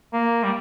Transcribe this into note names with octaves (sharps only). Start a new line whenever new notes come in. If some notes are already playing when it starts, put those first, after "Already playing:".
A#3
G3